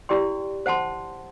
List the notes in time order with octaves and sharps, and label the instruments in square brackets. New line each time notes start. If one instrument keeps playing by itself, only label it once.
[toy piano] E4 G4 D5 G5 C6
C5 F#5 A5 C6